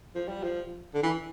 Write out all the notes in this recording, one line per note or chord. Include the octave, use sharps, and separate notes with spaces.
F3
G3
F3
D3
E3